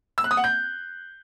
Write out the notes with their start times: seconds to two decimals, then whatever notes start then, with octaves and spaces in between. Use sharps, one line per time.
0.18 E6
0.24 F#6
0.31 D#6
0.37 F#5
0.44 G6